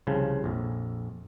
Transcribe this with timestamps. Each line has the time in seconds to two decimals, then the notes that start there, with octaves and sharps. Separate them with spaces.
0.07 C2 C#3 F3
0.44 A#1 F2